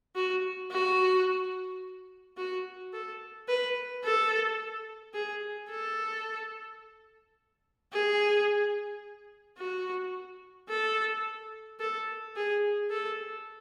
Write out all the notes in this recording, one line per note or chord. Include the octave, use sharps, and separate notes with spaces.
F#4
F#4
F#4
A4
B4
A4
G#4
A4
G#4
F#4
A4
A4
G#4
A4